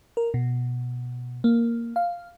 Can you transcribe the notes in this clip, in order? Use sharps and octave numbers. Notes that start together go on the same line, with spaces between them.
A#4
B2
A#3
F5